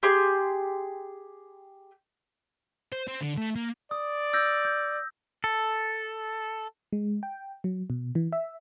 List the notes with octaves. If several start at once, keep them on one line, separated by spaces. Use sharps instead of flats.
G4 G#4 C6
C5
C4
D3
A3
A#3
D5 D#6
E6 G6 A#6
G6
A4
G#3
G5
F#3
B2
E3
E5